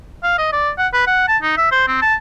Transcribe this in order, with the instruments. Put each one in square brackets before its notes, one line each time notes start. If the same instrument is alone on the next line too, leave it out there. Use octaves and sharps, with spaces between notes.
[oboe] F5
D#5
D5
F#5
B4
F#5
A5
D#4
E5
C5
C4
A5